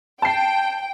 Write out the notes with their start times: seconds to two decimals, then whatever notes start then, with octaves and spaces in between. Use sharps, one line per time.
0.22 G5 A5 C7